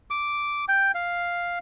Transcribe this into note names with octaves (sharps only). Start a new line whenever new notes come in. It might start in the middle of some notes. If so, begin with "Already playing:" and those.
D6
G5
F5